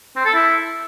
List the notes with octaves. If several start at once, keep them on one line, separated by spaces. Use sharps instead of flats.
C4
A4
E4